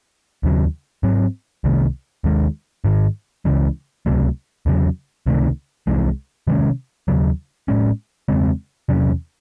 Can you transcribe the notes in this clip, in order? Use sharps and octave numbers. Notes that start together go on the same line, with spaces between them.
D#2 C#3 F#3
G#2 F#3 C4
C2 C3 D#3 A3
D#2 D#3 G#3
G#2 D#3 G#3
C#2 C#3 E3 G#3
C#2 C3 F#3 A3
E2 C#3 F#3
C#2 C3 D#3 A3
C2 C3 E3 G#3
C3 D#3 G#3 C#4
D#2 C#3 F#3
A2 G#3 C#4
E2 C#3 G#3 C4
E2 C3 F#3 C#4